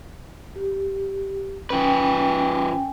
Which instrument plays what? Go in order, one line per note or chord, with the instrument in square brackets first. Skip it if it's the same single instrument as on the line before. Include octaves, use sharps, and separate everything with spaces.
[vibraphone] G4
[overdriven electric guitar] F3 B4 [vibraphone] C#4 G5 G#5